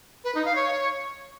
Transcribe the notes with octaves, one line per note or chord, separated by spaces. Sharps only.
B4
D#4
F5
C#5